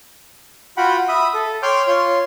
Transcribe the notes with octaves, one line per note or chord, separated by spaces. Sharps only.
F4 F#4 F#5 G5 B5
E5 B5 D#6
A4
C#5 G5 C6 D6 F6 G6
F4 C#5 C6